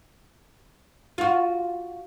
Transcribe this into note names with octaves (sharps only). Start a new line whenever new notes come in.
F4 F#4